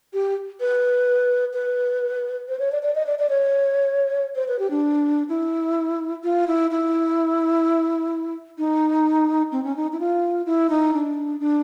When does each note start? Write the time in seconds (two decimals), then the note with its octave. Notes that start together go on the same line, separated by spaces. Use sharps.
0.13 G4
0.60 B4
1.53 B4
2.48 C5
2.59 C#5
2.72 D5
2.83 D5
2.95 D#5
3.06 D5
3.19 D5
3.29 C#5
4.36 C5
4.48 B4
4.59 G4
4.71 D4
5.29 E4
6.24 F4
6.47 E4
6.71 E4
8.58 D#4
9.52 C4
9.64 C#4
9.76 D#4
9.93 E4
10.00 F4
10.46 E4
10.70 D#4
10.94 D4
11.40 D4